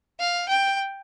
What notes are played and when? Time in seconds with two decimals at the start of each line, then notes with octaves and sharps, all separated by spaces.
0.20 F5
0.49 G5